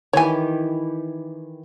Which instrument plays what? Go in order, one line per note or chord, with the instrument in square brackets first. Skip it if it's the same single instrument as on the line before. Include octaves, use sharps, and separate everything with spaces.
[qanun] D#3 E3 G4 [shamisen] C#5 G#5